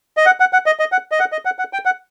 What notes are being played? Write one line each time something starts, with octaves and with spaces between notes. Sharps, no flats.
D#5
F#5
F#5
F#5
D#5
D#5
F#5
D#5
F#5
D#5
F#5
F#5
G5
F#5